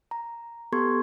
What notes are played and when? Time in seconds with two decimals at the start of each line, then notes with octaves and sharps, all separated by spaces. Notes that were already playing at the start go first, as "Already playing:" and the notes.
0.11 A#5
0.72 B3 G4 A4 C6 C#6 G#6